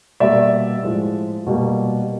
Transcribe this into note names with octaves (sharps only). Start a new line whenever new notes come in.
B2 G3 A#3 D5 E5
A2 F3 G#3
B2 G3 A#3